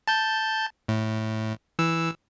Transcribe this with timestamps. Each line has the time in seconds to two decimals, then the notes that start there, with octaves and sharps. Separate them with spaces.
0.08 A5 G6
0.88 A2
1.79 E3 E6